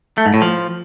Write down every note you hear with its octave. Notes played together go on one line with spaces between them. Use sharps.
A3
G#2
A2
F3